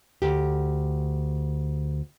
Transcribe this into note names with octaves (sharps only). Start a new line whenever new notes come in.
D2 G4